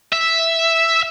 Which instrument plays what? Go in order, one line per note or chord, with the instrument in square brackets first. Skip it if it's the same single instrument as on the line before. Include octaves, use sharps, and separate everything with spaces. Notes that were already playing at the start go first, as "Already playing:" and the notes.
[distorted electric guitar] E5